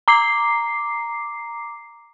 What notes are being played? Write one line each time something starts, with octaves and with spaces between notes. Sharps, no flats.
A#5 D6 C7